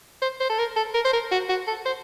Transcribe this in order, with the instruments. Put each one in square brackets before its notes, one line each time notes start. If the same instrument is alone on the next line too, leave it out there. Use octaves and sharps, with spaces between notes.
[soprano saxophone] C5
C5
A4
A#4
A4
A#4
C5
A#4
F#4
F#4
A4
C5